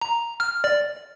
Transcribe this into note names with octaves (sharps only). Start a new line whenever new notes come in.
A#5
F6
D5